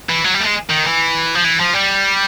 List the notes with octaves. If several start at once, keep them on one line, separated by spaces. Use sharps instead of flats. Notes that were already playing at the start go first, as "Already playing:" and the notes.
E3
F#3
G3
A3
G#3
D#3
E3
F3
E3
F3
G3